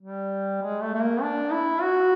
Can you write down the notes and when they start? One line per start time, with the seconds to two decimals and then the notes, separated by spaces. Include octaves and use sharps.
0.01 G3
0.62 G#3
0.82 A3
0.94 A3
1.02 A#3
1.22 D4
1.52 E4
1.82 F#4